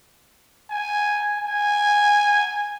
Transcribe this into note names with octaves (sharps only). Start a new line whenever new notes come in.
G#5
G#5